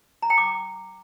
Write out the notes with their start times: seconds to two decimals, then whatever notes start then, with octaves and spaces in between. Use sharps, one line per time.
0.22 A#5
0.30 G5
0.38 D6